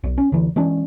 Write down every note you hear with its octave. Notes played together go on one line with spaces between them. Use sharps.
B1
C#4
D2 E3
E3 G#3 C#4 D4